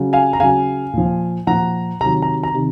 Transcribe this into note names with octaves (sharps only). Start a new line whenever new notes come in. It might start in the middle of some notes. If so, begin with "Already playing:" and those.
Already playing: C#3 F#3
F5 G#5
A#5
C#3 F#3 F5 G#5
A#2 F3
A#2 F3 F#5 A#5
C3 D#3 F#3 A#5
A#5
A#5
C3 D#3